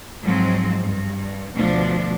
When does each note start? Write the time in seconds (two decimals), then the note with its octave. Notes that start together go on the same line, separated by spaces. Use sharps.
0.22 G#2 F3 F#3 G#3 C4
0.82 G2
1.54 D2 B2 F3 D4